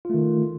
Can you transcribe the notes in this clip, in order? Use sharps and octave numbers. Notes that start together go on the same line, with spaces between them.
D#3 A3 F4